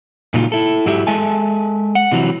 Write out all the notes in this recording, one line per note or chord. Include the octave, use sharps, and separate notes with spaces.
A#2 C#3 F#3 A#3 D#4 F4
E4 A4
G#2 F#3 E4 G4 E5
G#3 A4 E5 G#5 A5
F#5
C3 E3 F#3